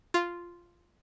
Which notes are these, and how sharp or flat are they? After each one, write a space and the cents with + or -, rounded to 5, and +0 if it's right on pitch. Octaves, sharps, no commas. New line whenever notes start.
F4 -5